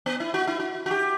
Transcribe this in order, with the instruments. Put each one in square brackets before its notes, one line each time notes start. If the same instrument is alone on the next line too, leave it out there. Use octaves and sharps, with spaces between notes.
[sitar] B3
E4
F#4
E4
F#4
F#4
G4